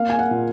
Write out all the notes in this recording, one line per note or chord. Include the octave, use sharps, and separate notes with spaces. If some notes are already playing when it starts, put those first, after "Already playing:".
Already playing: A#3 F5
G#5
F#5
A#2